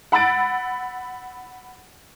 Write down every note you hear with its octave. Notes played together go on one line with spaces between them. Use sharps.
F#5 B5 E6 A6 D7